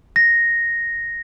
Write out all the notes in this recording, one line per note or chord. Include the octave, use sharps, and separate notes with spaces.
A#6